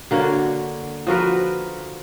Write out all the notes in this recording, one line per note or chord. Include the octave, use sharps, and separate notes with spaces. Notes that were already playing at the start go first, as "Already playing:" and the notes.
D3 A#3 F#4 C#5
F3 F#4 A#4 B4